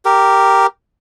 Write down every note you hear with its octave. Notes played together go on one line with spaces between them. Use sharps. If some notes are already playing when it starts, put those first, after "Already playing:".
G4 A#4